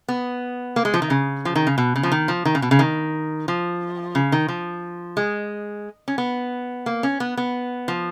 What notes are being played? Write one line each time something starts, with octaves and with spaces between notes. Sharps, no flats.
B3
A#3
G#3
F3
D#3
C#3
F3
D#3
C#3
B2
C#3
F3
D#3
F3
D#3
C#3
B2
C#3
D#3
F3
C#3
D#3
F3
G#3
C#4
B3
A#3
C#4
B3
B3
F3